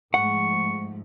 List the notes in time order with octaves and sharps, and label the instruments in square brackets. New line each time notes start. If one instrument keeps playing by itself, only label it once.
[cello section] G#2 F3 A3 [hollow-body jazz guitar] F#5 [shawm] C#6